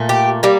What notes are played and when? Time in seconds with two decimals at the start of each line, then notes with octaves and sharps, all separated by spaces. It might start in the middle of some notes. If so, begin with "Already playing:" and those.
Already playing: A#2 A3
0.09 G4
0.43 G3 A#3